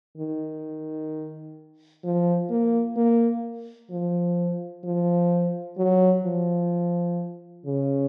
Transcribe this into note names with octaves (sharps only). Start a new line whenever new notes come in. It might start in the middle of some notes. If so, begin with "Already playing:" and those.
D#3
F3
A#3
A#3
F3
F3
F#3
F3
C#3